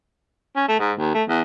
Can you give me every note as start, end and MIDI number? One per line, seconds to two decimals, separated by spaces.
0.56 0.66 61
0.69 0.79 57
0.80 0.93 44
0.99 1.12 39
1.14 1.23 57
1.29 1.41 40